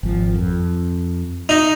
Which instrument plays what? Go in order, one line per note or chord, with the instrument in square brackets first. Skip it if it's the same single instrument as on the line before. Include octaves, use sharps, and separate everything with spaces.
[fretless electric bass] G#1 F3
F2
[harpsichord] D#4